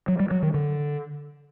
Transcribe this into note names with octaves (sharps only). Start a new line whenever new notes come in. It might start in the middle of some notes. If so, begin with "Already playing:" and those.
F#3
G3
F#3
D#3
D3